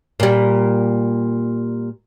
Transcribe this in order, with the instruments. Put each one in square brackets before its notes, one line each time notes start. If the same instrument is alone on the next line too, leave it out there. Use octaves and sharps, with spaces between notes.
[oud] A#2 G3